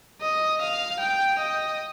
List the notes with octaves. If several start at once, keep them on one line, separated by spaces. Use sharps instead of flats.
D#5
F5
G5
D#5